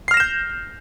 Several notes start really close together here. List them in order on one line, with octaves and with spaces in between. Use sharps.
C7 F6 A#6 E7 G6